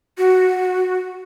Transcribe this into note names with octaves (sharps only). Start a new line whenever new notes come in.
F#4